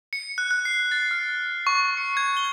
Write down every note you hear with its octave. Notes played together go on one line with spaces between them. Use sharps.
C#7
F#6
F#6
C7
A6
F6
C#6
C#7
G#6
G7